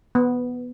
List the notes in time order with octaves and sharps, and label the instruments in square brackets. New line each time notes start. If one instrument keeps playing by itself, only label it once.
[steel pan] B3